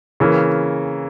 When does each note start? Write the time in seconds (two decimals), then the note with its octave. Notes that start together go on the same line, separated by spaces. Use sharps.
0.20 C#3 E3 A#3